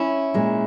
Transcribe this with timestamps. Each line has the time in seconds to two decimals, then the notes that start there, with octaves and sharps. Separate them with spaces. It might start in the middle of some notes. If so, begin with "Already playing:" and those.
Already playing: C#4 E4
0.34 A#2 G#3